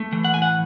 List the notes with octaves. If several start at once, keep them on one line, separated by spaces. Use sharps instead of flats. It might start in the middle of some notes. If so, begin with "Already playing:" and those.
Already playing: A3
E3
F#5
A2 G#5
F#5